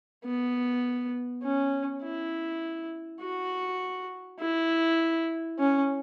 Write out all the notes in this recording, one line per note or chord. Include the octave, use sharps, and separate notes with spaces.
B3
C#4
E4
F#4
E4
C#4